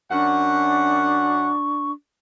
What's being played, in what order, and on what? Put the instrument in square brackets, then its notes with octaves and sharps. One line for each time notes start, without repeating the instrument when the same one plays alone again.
[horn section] F#2 F#5 [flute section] D4 C#6